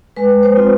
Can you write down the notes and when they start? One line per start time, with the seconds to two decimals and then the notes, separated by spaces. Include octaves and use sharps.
0.16 G#3 B4
0.43 C5
0.57 C4 F4